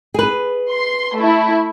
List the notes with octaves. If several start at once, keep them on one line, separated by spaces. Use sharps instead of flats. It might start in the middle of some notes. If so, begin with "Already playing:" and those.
G#4 B4
C6
A3 E4